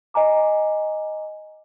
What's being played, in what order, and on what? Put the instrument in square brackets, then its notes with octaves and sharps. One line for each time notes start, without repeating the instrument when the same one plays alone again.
[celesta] D#5 G#5 A#5 D6